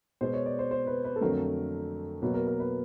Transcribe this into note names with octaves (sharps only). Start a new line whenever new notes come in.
B2 G#3 B3 C5
C#5
D5
C5
C5
B4
B4
A4
F2 D3 F#3 A3 A#4
B2 F#3 A#3 B4
A#4
A#4
B4